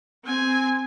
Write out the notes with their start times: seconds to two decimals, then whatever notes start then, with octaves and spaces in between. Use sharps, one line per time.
0.24 C4 G#5